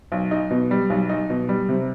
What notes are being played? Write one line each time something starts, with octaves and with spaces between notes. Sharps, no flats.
B1
D#4
B2
G3
B1
D#4
B2
G3
C3